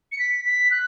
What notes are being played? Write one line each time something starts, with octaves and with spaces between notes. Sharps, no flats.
C#7
B6
B6
F#6